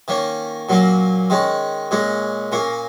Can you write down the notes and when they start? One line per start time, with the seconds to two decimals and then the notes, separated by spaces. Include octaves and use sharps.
0.08 D#3 A#3 C#4
0.69 A#2 F#3 A#3 C#4
1.30 D#3 G#3 C#4
1.91 A#2 G#3 C#4
2.52 A#2 A#3 C#4